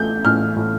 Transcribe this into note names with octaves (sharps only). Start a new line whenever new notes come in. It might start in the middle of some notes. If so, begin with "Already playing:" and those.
Already playing: A1 A3 G6
A2 F6
A2